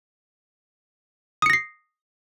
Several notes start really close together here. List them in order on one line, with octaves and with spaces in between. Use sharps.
D#6 C#7 A#6 C7